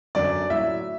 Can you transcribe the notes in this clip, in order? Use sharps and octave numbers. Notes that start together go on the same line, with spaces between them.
F#2 D3 F#3 D5
A2 F#3 E5